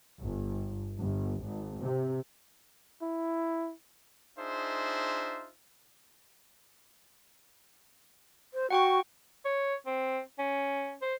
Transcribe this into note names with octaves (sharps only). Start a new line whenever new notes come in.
G1
G1
G#1
C3
E4
D4 D#4 F4 G#4 C5 E5
C5
F#4 F#5 G5 C#6
C#5
C4
C#4
C5